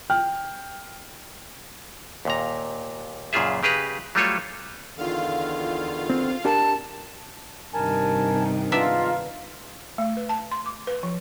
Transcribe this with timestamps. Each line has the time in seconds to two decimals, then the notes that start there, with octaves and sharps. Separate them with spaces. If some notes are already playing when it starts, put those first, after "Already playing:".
0.10 G5 F6
2.25 D#2 A#2 A#5
3.33 F#2 A#2 C#3 F4 G#4 E5
3.63 C#3 G4 G#4 B4 A#5
4.15 F#3 G3 A3 F4 A4 C#5
4.98 E2 D3 D#3 F4 F5
6.10 C4
6.45 D4 G4 A#4 A5
7.74 G2 C3 D#3 A#4 G#5 A5
8.72 G#3 B3 D4 F4 E5 A#5
9.98 A3
10.17 B4
10.29 A5
10.52 C6
10.66 D6
10.87 B4
11.03 F3